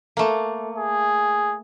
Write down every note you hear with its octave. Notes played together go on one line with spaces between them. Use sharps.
A3 A#3
G#4